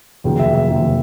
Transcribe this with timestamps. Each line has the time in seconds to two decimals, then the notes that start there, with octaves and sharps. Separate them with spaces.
0.24 F1 D#2 C#3 F#3
0.39 E5
0.54 E5
0.70 F1 D#2 C#3 F#3